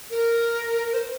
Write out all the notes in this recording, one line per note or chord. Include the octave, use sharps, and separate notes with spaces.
A#4
C5